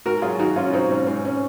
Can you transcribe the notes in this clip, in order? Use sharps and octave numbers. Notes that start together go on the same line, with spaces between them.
G#2 F#4 A#4
F#3 F4 G#4
D#3 D#4 F#4
F#3 C#4 F4
F#3 C4 D#4
G#2 C#4
G#2 C4
C#4